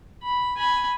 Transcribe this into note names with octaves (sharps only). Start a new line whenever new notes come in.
B5
G#5 B5